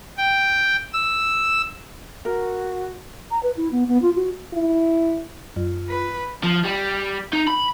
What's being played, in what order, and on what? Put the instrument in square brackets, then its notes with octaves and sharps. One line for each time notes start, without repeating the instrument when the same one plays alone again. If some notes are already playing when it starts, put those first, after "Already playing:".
[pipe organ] G5
E6
[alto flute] F#4 [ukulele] A#4
[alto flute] A#5
B4
E4
B3
B3
F4
F#4
[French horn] E4
[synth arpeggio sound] F#2 [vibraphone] F4
[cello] B4
[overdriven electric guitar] F3
G3
D#4
B5